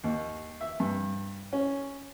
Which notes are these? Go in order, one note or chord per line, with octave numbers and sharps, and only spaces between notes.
D#2
E5
G2
C#4